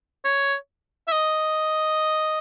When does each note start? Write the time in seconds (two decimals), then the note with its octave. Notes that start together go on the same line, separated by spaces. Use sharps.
0.25 C#5
1.08 E5
1.12 D#5